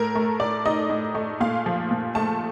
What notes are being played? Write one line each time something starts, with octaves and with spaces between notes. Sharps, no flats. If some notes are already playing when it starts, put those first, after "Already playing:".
Already playing: A2 A#4
A3
A2 D5
D#4 D#5
A2
A3
A#2 F5
F3
A#2
A3 A5